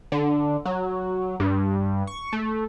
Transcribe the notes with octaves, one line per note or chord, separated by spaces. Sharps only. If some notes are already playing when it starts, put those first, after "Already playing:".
D3
F#3
G2
C#6
A3